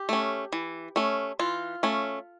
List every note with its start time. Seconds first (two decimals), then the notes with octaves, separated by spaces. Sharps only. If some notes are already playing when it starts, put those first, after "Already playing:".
Already playing: G4
0.09 A3 C#4
0.52 E3
0.96 A3 C#4
1.39 E3 F4
1.83 A3 C#4